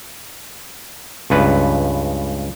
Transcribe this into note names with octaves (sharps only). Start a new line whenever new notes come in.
C#2 G2 B4